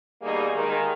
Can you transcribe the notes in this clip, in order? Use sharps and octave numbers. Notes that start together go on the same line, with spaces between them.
B2 D#3 G3 A#3 D#4 G#4
D#3 G#3